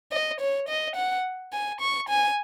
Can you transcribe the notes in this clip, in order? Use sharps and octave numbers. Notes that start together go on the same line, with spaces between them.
D#5
C#5
D#5
F#5
G#5
C#6
G#5